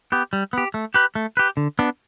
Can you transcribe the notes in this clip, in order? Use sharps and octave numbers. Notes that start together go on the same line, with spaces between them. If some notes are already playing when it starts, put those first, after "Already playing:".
B3 G4
G3
B3 G4
A3
G4 B4
A3
G4 B4
D3
B3 D4